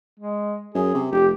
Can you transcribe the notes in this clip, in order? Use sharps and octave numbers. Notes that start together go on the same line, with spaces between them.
G#3
F#2 G#4
C3
F1 G4